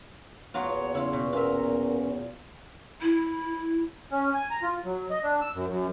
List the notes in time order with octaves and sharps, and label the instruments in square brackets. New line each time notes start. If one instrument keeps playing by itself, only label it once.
[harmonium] E2 A#2 [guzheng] F#3 B3 F4 [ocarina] C#5
[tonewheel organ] C#3 [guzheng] E4 F4
[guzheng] B2
[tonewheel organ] B3 C#4 [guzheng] F4 E5 [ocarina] A#4
[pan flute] E4
[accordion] C#4
G#5
A#5
F4
F#3
D#5
D4
E6
F#2
F#2